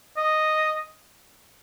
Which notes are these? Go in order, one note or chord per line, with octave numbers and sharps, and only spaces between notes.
D#5